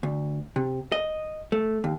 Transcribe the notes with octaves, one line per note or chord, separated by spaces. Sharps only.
D2
C3
D#5
A3
D#2